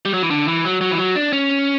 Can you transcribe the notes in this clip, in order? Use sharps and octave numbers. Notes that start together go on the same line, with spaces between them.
G3
F#3
E3
D3
E3
F#3
F#3
E3
F#3
D4
C#4